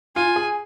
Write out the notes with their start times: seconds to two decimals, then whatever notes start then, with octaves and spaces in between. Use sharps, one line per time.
0.16 F4 G#5
0.36 G#4